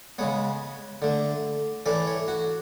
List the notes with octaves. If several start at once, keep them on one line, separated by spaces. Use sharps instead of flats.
C#3 G#3 B3 C#5
D3 A3
A2 E3 A3 D5
C#5
F#4